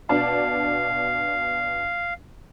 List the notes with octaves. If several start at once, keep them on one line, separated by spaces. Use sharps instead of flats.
B2 D4 F5 A5